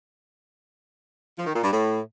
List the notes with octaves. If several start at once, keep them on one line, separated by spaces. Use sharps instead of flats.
F3
D#3
A#2
G2
A2